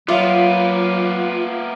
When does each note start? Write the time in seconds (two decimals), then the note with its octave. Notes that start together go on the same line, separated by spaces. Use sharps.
0.08 F#3 A#3 B3 F4 D5 E5 F5